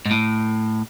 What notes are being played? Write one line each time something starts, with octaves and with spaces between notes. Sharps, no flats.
G#2
A2